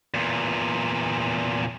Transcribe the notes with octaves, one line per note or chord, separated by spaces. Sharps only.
E2 A#2